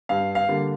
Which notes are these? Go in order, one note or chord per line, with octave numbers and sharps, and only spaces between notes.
G2 F5
F5
D3 G3 A#3